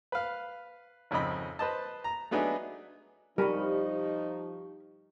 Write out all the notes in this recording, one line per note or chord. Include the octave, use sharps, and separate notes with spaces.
B4 F5
G#1 F2 C#3 D#5 B5
B4 C5 D#5 A5
A#5
F#3 A3 B3 D4 D#4 G#4
F3 G3 D#4 G4 A#4 G#5 B5 C#6